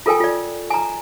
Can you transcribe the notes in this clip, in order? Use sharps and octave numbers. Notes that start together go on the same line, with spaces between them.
F4 A4 A#4 G5 G#5
F4 D5
G#5 A#5